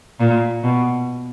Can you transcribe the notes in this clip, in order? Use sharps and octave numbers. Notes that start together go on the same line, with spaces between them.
A#2
B2